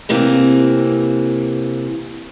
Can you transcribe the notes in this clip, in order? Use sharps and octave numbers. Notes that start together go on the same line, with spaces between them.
C3 E3 A#3 C4